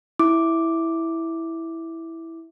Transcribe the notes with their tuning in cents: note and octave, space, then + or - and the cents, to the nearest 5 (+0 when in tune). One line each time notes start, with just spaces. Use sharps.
E4 -5 D6 +0